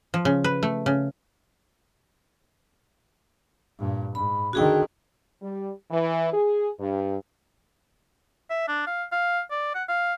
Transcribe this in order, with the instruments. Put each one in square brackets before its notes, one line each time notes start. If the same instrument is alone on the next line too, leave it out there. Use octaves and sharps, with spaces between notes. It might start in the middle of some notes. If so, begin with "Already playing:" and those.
[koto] F3
C#3
B4
A3
C#3
[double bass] G2 A#2
[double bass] G#2 [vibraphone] B5
[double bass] D3 D#3 [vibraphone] F#4 G#4 G5
[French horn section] G3
E3
G#4
G2
[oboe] E5
D4
F5
F5
D5
F#5
F5